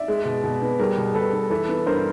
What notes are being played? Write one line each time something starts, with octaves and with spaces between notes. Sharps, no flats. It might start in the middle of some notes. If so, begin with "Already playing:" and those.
Already playing: D5 E5
G#3
B2
B2
B3
G3 G#4 A#4
B2
B2 A4 B4
B3
E3 A4 B4
B3
G2 A#4 C5